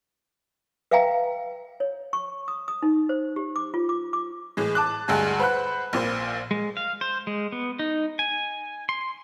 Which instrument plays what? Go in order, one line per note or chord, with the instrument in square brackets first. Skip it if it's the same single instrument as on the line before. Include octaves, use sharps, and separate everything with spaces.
[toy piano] B4 E5 F5 G5 G#5 A#5
C#5
C#6
D#6
D#6
D#4
C5
G4
D6
F4
D6
D6
[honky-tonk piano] A2 E3 G#3
A5 D6 F#6
D2 G2 G#3 G#5
B4 C5 F#5 B5 F#6
A#1 A#2 C5
[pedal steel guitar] G#3
F5
C5
G#3
B3
D#4
G#5
C6